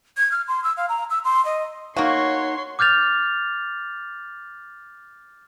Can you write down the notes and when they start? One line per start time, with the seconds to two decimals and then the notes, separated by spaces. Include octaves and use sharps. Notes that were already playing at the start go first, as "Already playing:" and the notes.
0.17 G#6
0.32 F6
0.48 C6
0.64 E6
0.77 F5
0.89 A#5
1.10 E6
1.25 C6
1.45 D#5
1.97 A#3 D#4 F#4 C#5 F5 C6
2.79 D6 F6 G6 A6 F7